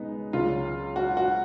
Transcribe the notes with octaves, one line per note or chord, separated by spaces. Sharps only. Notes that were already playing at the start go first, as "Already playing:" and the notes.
Already playing: C#2 B2 G#3 B3 D#4
C#2 C#3 F#3 F4
F#4
F#4